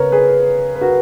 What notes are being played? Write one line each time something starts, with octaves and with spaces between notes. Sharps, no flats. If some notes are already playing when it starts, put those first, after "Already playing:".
Already playing: C#3 B3 A#4 B4 C#5
G#4 B4
B4
F#4 A#4